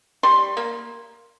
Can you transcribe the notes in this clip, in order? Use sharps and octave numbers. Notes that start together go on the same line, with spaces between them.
G3 C6
A#3